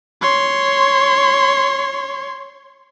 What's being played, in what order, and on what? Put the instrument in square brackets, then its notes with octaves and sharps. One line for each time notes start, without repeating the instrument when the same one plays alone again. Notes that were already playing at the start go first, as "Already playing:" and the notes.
[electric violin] C#5 C6